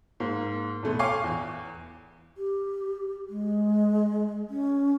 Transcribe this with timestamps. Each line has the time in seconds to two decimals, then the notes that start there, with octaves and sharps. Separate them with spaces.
0.20 G#2 A#3
0.83 E2 B2 A3 B3
0.99 C#5 F5 G5 G#5 C#6 D6
1.24 E2 E3
2.37 G4
3.29 G#3
4.50 C#4